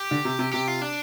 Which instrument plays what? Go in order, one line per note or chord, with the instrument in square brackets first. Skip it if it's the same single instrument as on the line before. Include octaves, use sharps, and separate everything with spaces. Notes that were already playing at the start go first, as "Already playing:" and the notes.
Already playing: [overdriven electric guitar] G4
[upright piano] D3
C3
C3
[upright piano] C3 [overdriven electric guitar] G4
[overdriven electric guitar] F4
D4